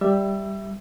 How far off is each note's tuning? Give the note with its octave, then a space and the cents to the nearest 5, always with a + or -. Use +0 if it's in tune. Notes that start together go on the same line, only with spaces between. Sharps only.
G3 +0 E5 +0 E6 +30